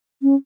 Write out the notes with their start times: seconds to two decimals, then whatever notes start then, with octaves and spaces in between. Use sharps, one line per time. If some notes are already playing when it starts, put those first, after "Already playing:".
0.22 C#4